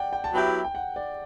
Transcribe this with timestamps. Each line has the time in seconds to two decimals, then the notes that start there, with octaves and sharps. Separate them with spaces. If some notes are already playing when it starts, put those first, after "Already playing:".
Already playing: D5 F#5 G5
0.13 G5
0.24 A5
0.33 F#3 B3 E4 G4 G5
0.64 G5
0.75 F#5
0.96 D5